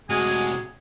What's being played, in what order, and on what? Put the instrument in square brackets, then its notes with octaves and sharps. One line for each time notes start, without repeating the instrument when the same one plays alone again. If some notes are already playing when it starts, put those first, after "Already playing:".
[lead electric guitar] A2 C3 [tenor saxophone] G#3 [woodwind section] F#4 G#4